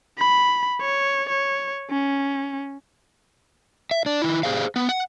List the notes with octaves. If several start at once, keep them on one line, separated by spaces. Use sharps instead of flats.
B5
C#5
C#5
C#4
E5
D4
D#3 E4
G4 G#4 C5 F5
B3
F#5